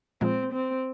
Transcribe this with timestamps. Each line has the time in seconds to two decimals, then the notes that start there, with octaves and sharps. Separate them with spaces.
0.21 A#2 F3 G#3 C4
0.53 C4